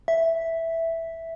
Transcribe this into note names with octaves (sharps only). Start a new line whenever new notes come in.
E5